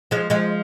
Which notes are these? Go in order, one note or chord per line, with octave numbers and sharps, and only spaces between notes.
F3 G#3
F3 G#3